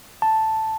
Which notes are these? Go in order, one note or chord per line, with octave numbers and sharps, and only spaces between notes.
A5